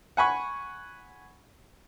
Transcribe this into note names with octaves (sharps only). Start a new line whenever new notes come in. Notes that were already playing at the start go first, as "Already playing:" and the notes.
F#5 G#5 B5 C#6